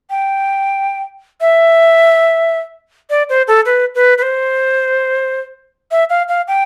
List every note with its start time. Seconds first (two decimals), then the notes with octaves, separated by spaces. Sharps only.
0.10 G5
1.41 E5
3.10 D5
3.29 C5
3.48 A4
3.66 B4
3.95 B4
4.18 B4
4.22 C5
5.91 E5
6.10 F5
6.29 F5
6.48 G5